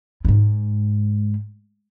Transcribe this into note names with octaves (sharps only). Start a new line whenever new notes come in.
G2
G#2